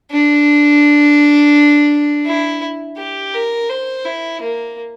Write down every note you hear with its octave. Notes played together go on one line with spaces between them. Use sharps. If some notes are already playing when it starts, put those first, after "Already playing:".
D4
E4
G4
A#4
C5
E4
A#3